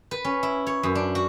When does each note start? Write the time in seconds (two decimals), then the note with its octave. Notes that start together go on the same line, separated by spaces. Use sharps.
0.11 B4
0.25 C#4
0.43 E4
0.67 C#5
0.83 F#2
0.95 D4
1.15 F#4